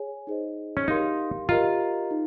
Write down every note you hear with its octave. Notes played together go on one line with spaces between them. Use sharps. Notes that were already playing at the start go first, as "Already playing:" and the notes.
Already playing: G#4 C#5 G#5
D#4 G#4 C5 D#5
C#4
D#4 G4 A#4 F5 C6
F4 G4 A#4 D#5 A#5
D#4